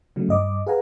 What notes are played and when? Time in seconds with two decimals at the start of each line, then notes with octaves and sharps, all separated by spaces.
0.16 C#3 F#3 G#3 A3
0.29 G2 D#5 D6
0.67 G#4 B4 F5 F#5 G#5 A#5